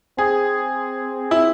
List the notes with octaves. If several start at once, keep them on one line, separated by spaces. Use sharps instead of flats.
C4 G#4
E4